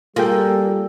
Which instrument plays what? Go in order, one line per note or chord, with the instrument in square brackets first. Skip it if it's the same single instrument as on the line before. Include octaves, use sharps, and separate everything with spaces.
[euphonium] G3 [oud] A#3 [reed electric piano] F4 G#4 G5 [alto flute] A4